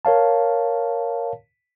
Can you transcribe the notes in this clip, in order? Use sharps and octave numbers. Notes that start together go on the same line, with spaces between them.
A#4 C#5 F5 A5